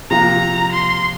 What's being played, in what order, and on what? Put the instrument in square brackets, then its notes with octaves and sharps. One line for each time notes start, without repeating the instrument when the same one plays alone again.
[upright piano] C3 F3 A#3 [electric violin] A#5
[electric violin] C6